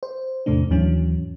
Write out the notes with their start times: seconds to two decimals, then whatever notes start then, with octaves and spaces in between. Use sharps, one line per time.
0.03 C5
0.46 E2 A2 C3 A3 D4
0.70 D#2 G#2 E3 F#3 C#4